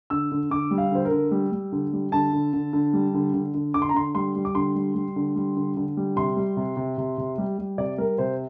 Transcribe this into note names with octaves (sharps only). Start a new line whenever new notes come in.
D3 E6
D3
D3 D6
G3
F5
D3 C5
A#4
D3
G3
G3
D3
G3
D3 A5
D3
D3
D3
G3
D3
D3
D3
D3 D6
C6
A#5
D3 C6
G3 C6
G3
D6
D3 C6
G3
G3
D3
G3
D3
D3
G3
C3 C6
G3
C3
C3
C3
C3
G3
G3
C3 D5
G3 A#4
C3 C5